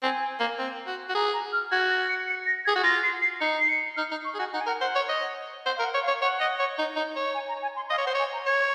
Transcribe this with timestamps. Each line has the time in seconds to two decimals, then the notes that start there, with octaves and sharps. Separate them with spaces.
0.03 C4 G#5
0.40 A#3
0.59 C4
0.87 F#4
1.09 F#4
1.15 G#4 A#5
1.34 A#5
1.53 F6
1.71 F#4 G#6
1.90 A#6
2.09 C#7
2.28 C#7
2.46 A#6
2.65 G#4 G#6
2.75 F#4
2.83 F4 A#6
3.03 C7
3.22 C7
3.40 D#4 C#7
3.60 C7
3.69 C#7
3.96 D#4 F6
4.11 D#4
4.25 C#6
4.34 G#4
4.39 F#4 G#5
4.53 D#4 F#5
4.61 G#5
4.66 A#4 F#5
4.81 C5 F#5
4.95 C#5
5.09 D#5
5.65 C5 F#5
5.76 A#4 F5
5.84 F#5
5.94 C#5
6.03 F5
6.08 C#5
6.21 C#5 F#5
6.41 D#5
6.59 C#5
6.78 D#4
6.96 D#4
7.16 C#5
7.34 G#5
7.49 A#5
7.62 G#5
7.76 C6
7.90 D#5 F5
7.98 C#5
8.05 C5 F#5
8.14 C#5 G#5
8.33 A#5
8.46 C#5 G#6